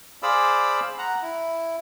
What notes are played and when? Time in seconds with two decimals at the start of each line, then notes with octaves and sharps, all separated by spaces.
0.23 G#4 C5 D5 F5 B5 E6
0.98 F#5 A#5
1.22 E4